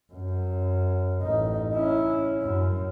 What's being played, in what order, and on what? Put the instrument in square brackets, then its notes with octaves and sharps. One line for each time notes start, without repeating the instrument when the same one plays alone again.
[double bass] F#2
A1 D#4
C#4 E4
F#2